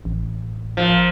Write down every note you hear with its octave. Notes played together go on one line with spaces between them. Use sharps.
A1
A#2 F3